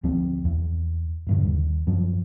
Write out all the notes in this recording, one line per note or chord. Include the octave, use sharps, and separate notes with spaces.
D2 F3 C4
E2
D#1 G2 D3
D#2
F#2 F3